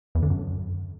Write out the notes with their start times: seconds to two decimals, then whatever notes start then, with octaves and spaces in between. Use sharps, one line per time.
0.15 E2
0.22 D3
0.30 F#2